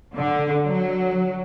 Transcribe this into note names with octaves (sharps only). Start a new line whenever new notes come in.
D3
F#3